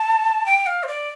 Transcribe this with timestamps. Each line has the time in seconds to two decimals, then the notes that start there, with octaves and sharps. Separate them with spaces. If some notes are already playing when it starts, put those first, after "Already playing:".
Already playing: A5
0.46 G5
0.66 F5
0.83 C5
0.88 D5